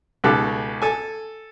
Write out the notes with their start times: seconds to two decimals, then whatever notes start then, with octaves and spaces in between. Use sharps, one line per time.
0.24 C#2 B2 D#4 G4 A4 F#6
0.82 A4 G#5